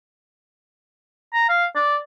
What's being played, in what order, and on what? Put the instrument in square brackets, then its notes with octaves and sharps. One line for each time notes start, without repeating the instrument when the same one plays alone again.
[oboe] A#5
F5
D5